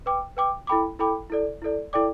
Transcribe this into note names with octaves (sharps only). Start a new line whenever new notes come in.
B4 G5 D6
B4 G5 D6
E4 A4 G5 B5 D6
E4 A4 G5 B5 D6
E4 A4 D5
E4 A4 D5
E4 A4 D5 G5 D6